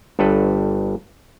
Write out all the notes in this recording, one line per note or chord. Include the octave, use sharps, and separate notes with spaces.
G1 G2 A4 B4